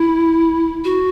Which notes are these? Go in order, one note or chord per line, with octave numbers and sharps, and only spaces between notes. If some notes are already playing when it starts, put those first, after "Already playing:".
Already playing: E4
F#4